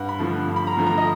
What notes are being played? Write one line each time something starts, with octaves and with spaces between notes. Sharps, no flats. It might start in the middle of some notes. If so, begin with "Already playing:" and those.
Already playing: G2 F#5
B5
D3 F3 A3
G2
B5
A#5
D3 F3 A3
A#5
D#5